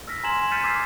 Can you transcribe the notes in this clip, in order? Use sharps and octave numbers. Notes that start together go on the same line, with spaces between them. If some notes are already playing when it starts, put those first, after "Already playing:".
E6 F6 A#6 B6
G#5 A#5 C6 G#6 E7 F#7
F6 G6 A6 B6 C#7 D#7
D6 E6 F6 G#6 A6 C7